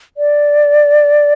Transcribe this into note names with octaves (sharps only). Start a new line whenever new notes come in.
D5